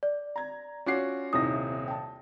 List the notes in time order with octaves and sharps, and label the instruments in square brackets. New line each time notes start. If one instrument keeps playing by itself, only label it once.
[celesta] D5
[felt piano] A#5 G#6
[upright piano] C#4 F#4 C7 [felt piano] F4 C#5 D6
[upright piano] D#1 C3 A#6 [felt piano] D#4 E4 [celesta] D#6
[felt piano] G5 A5